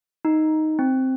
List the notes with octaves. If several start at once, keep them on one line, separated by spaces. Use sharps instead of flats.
D#4
C4